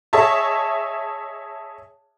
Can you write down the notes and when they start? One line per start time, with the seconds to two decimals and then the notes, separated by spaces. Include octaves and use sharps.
0.13 G#4 C#5 D#5 E5 A5